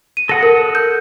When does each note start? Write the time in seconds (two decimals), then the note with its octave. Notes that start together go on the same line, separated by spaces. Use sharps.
0.17 D#7
0.29 A4 F#5 D#6 A#6
0.43 A#4
0.75 G6